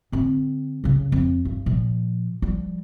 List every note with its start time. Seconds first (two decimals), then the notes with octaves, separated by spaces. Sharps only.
0.12 D3 C4
0.84 F#2 C#3
1.12 F2
1.45 G2
1.66 A#2 F3
2.42 F3 G3